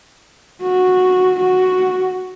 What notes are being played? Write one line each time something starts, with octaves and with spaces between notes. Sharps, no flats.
F#4
F#4